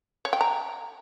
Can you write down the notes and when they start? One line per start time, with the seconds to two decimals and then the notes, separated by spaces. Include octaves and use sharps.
0.25 C#5
0.33 G5
0.41 A#5